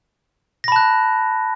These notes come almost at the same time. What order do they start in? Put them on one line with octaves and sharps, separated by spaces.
A#6 B5 A5 F#6